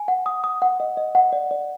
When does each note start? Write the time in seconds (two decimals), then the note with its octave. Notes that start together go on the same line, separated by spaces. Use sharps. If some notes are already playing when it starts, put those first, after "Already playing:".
Already playing: G#5
0.08 F#5
0.26 D#6
0.44 D#6
0.62 F#5
0.80 D#5
0.97 D#5
1.15 F#5
1.33 D5
1.51 D5